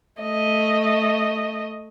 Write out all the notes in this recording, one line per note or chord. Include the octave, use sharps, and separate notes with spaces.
A3 D#5